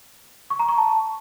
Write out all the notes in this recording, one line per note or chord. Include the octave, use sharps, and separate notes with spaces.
C#6
A#5
C#6
A5